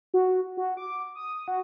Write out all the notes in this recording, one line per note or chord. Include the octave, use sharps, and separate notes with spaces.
F#4
F#4
D6
D#6
F#4